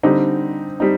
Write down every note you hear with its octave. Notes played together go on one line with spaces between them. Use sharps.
D3 G3 C4 D#4
G3 C4 D#4